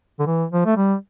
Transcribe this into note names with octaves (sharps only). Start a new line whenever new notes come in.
D3
E3
F3
A3
G3